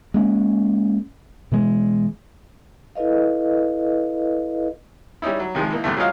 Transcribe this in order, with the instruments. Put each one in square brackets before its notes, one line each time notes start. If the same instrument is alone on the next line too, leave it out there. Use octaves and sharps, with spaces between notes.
[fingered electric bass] G#3 A#3 C#4
B2 E3 G#3
[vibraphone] E4 A4 B4 D#5 F5
[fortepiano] G3 C#4 D#4 E4
F#3
C3 D#3 F3 G#3
E3 A#3 D#4
E2 G2 C3 A3
F#3 G#3 C#4 F4 D#5 F5